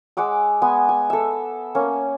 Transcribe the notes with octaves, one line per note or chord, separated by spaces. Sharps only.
G#3 F#5 D6 E6
G#3 B3 G#5
G#5
A4 E5
A#3 C#4